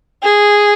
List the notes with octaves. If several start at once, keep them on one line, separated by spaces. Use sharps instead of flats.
G#4